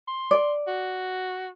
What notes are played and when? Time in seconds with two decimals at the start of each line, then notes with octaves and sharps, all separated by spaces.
0.08 C6
0.31 D5
0.67 F#4